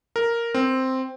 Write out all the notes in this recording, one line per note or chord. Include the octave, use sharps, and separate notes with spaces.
A#4
C4